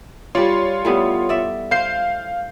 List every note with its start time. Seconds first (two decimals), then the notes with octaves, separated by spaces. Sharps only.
0.35 G3 F4 C#5 D5 C6
0.85 A2 G3 B3
1.29 D5 E5
1.71 C5 F5 G5 G6 C7